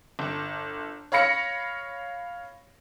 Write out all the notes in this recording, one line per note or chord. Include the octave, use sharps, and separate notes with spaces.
G1
C#5 F5 B5 A#6 C#7